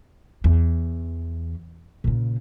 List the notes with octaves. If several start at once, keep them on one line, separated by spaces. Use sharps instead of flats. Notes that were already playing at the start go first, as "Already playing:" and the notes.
E2
A#2 C#3